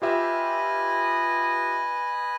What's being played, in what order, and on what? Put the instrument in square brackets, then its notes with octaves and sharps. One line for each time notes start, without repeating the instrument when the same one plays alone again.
[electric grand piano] F4 G4 E5 [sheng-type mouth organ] B4 D#5 G#5